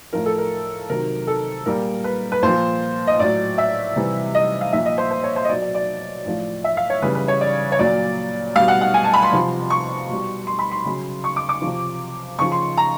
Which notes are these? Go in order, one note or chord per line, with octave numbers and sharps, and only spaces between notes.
A2 F3 A#4
A4
A#4
C3 D#3 F#3 A#4
A4
A#2 G3 A#4
B4
B4
A#2 F3 C5
D#5
A2 F#3 D5
E5
C3 E3 G3
D#5
F5
A#2 F3 E5
D#5
C5
C5
C#5
C5
D#5
B2 F#3 D5
D5
D5
A2 F3
E5
F5
C#5
C#3 E3 G3 B4
B4
C#5
D5
C#5
A#2 F#3 D5
B2 G3 F5
F#5
F#5
G#5
A5
B5
C6
C3 F3
C#6
B2 G3
C6
B5
C6
C#3 F#3
C#6
D6
D6
C3 F3
C#3 F3 C#6
C6
A#5